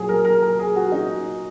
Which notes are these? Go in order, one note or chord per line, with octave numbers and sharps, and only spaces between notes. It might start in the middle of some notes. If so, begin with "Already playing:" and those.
Already playing: A#2 F#3 G#4
A#4
A#4
A#4
G#4
F#4
D#4